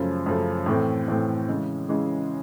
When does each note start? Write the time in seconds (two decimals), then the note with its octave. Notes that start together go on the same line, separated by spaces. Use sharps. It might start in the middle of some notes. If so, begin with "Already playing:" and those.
Already playing: F#2 C#3 F3 A3
0.26 F#2 C#3 F3 A3
0.66 A2 E3 A3 C4
1.08 A2 E3 A3 C4
1.48 C#3 E3 G#3
1.89 C#3 E3 G#3